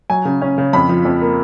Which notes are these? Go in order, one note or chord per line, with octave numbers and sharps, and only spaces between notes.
F#3 G#5
C#3
C#4
C#3
F2 B5
F3
F2
A#3